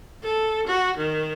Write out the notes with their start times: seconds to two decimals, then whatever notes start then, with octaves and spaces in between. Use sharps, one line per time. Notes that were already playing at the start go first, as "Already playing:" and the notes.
0.23 A4
0.66 F#4
0.96 D#3